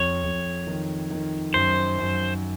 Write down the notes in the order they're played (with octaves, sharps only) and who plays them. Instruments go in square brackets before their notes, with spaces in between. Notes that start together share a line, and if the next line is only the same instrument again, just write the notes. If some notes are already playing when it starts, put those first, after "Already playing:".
Already playing: [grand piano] F2 [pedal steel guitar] C#5
[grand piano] F2
D#3
D#3
[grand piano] F#2 [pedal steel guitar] C5
[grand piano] F#2